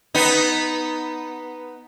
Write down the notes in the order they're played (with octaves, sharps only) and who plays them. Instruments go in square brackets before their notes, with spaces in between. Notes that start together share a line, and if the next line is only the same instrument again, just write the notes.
[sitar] B3 D#4